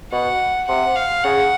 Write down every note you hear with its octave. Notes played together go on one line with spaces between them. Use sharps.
B2 F#5
C3 F#5
F5
C#3 F#5